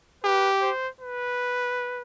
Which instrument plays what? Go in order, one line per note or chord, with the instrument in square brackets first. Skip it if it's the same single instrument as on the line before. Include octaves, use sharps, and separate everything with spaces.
[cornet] G4 [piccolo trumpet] B4
[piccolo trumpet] C5
B4